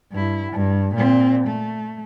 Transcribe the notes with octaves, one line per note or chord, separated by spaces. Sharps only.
G2 E4
G2
A#2 C4
A3